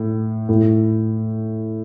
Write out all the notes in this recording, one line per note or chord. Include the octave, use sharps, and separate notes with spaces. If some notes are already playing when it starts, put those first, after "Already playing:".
Already playing: A2
A2